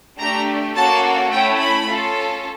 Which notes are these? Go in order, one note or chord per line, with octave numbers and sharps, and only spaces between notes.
A3 D4 G4 A#5
A#3 C#4 F#4 A4 A5
A3 C#4 E4 G5
B5
C#4 F4 A4